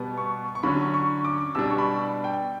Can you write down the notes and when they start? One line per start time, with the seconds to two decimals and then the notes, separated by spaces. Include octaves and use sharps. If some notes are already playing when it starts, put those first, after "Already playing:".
Already playing: B2 G3 B3
0.18 C#6
0.55 C#6
0.63 D3 F#3 C#4 B5
0.94 C#6
1.25 D6
1.55 B2 G3 D4 E6
1.71 C#6
1.78 B5
2.24 G5